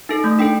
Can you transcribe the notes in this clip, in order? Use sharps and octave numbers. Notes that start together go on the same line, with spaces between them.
D#4 A4
A3
D4 A4 G5